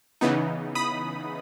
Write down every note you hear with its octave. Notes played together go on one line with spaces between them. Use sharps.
C#3 E3 B3 D#4
B5 D#6